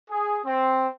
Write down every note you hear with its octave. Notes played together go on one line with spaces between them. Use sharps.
G#4
C4